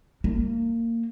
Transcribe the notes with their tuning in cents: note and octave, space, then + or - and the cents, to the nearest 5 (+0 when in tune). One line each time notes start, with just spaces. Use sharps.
A#3 -20